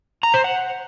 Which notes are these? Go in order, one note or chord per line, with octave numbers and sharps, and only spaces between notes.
A#5
C5
F#5